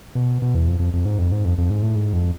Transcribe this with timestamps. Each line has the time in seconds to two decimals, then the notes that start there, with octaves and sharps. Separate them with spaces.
0.15 B2
0.42 B2
0.55 E2
0.68 F2
0.80 F2
0.94 F2
1.05 G#2
1.19 F2
1.32 G#2
1.45 F2
1.58 F2
1.70 G#2
1.83 A2
1.96 G#2
2.13 F2